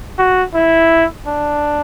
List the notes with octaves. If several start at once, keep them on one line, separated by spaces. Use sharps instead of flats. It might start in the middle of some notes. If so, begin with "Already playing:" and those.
F#4
E4
D4